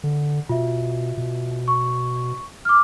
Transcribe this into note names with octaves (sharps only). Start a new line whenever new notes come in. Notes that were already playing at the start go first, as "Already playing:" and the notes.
D3
B2 F4 E5
B2
C#6
D6 F6